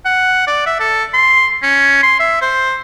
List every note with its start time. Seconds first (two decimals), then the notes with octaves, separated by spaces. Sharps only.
0.05 F#5
0.47 D5
0.66 E5
0.80 A4
1.14 C6
1.62 C#4
2.03 C6
2.20 E5
2.42 C5